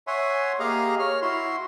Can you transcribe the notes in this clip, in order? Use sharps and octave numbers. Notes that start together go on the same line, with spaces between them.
C#5 E5 F#5 G#5 C6
A#3 G4 G#4 D#5 F5 A#5
C#5 F6
E4 F#4 C6